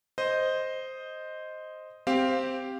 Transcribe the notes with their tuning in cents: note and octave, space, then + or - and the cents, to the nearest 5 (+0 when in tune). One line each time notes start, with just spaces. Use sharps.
C5 +0 D#5 +0
C4 +0 G4 +0 F5 +5